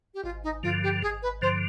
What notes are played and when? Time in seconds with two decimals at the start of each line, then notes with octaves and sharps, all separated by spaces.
0.14 G4
0.24 G#1 F4
0.44 D#4
0.63 G2 D3 F3 F4
0.83 G4
1.02 G#1 G#4
1.22 B4
1.41 G2 D3 F3 C5